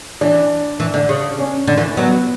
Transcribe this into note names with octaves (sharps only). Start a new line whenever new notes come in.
E3 D4
E3
D3
C#3
C#4
D3
E3
F#3 B3